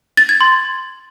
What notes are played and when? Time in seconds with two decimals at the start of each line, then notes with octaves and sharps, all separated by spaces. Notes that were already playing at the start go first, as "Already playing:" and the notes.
0.17 A6
0.29 G#6
0.41 C6